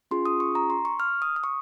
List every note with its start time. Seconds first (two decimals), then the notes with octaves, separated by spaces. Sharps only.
0.11 C#4 F4 G#4 C6
0.26 D#6
0.40 C#6
0.55 A#5
0.70 C6
0.85 C#6
1.00 F6
1.22 D#6
1.36 D#6
1.44 C#6